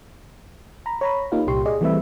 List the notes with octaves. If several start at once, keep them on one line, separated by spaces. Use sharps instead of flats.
A#5 B5
C#5 A#5 B5
A#3 D#4 F4 G4 F5
C2 A#2 G4 C6 C#6
G#4 D5 D#5
E3 G3 A3 C4 B4 E5